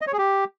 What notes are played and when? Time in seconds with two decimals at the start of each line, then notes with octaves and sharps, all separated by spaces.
0.02 D#5
0.07 C#5
0.13 G#4
0.18 G4